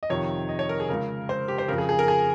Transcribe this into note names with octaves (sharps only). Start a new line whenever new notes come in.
D#5
F2 C3 D#3 C#5
D#5
C#5
A#4
G#4
C#2 C#3 A#4
C5
G4
C5
F2 C#3 A#4
G#4
G#4
A#4
G#4